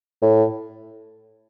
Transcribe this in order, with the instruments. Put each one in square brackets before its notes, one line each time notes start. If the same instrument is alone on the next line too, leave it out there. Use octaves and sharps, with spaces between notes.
[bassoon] A2